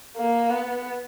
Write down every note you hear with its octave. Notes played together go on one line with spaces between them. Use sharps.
A#3
B3